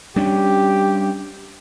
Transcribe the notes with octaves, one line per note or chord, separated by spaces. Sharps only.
G3 C#4 D4 G4